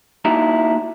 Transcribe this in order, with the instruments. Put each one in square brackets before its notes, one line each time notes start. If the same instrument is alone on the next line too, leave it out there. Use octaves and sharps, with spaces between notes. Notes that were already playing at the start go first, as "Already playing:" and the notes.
[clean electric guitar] A#3 D#4 E4 F#4 A5 A#5